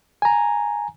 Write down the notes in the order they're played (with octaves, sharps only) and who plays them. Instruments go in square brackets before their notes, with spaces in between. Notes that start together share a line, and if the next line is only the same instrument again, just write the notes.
[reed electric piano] G#5 A#5